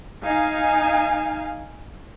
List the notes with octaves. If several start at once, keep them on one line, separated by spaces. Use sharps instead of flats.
D#4 F5 G#5